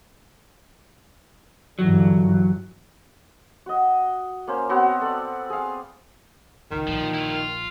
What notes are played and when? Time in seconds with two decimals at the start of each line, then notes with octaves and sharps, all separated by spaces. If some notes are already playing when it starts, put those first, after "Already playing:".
1.79 G2 D3 E3 F#3
3.66 F#4 D#5
4.47 A#3 C#4 C5
4.69 B3 C4 F#4 C#5
5.01 A4 D5
5.50 G#4 F5
6.71 C#2 D#3
6.87 A#1 F3
7.14 E4 F4
7.36 F4